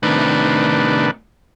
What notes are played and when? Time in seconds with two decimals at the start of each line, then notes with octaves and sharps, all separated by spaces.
0.03 A2 C3 D#3 D4 B4